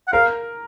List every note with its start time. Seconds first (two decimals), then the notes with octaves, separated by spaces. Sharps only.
0.08 F#5
0.12 A#4 F5